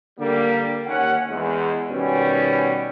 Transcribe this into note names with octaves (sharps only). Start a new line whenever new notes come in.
D3 G3 A#3
D#2 C#4 F#5
E2 G#3
B2 D#3 G3 B3 C#4